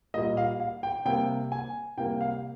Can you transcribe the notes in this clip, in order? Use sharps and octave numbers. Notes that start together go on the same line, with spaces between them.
A#2 G3 A#3 D#5
F5
F5
G5
C3 G3 A#3 G5
G#5
C3 G3 A#3 G5
F5